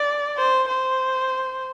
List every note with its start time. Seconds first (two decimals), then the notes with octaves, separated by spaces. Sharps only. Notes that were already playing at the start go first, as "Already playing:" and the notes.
Already playing: D5
0.37 C5
0.68 C5